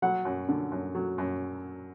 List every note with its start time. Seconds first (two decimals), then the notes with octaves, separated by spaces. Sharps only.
0.02 F#3 F#5
0.25 F#2
0.49 D3
0.72 F#2
0.95 F#3
1.18 F#2